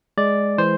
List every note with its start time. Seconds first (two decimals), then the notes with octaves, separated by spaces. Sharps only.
0.18 G#3 D5
0.58 E3 C5